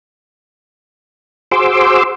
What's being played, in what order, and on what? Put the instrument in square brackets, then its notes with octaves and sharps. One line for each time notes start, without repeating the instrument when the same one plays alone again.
[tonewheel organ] F#4 G#4 C5 C6 D6 E6